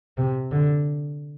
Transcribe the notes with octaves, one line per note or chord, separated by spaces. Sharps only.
C3
D3